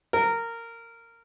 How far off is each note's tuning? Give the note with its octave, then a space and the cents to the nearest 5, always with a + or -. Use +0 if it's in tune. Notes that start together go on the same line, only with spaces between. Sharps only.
A#4 -15